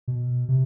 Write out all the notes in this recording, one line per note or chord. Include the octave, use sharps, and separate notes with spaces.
B2
C3